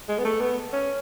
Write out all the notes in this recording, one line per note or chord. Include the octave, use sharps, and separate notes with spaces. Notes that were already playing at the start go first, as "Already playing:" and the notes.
G#3
B3
A3
B3
C#4